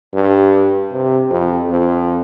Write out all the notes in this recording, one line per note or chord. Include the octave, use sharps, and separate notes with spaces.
G2
C3
F2
F2